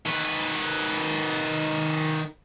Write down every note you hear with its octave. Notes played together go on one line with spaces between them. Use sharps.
D#3 B4